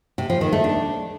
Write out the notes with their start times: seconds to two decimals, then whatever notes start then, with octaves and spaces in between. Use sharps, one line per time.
0.18 C3
0.30 F3
0.41 D#3
0.52 A3
0.64 D4